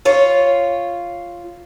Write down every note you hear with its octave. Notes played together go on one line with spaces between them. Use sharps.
F4 C#5